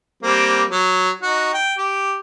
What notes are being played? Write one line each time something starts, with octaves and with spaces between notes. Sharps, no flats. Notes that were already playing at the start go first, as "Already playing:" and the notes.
G3 A#3 C4
F#3
D#4 F#4
G5
G4